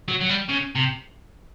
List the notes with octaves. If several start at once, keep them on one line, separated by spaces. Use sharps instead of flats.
F#3
F#3
G3
C#3
C3